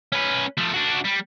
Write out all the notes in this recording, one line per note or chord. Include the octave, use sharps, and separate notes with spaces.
C#4 B4
F3 A3
D4 F#4
G3